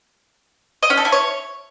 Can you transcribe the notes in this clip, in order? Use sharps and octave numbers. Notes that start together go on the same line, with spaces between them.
D#5
C#4
A4
E4
C#5